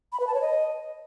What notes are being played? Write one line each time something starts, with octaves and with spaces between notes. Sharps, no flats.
B5
B4
A5
C#5
D#5